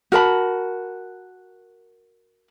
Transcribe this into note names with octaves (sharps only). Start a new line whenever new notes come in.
F#4 A#4 A5 B5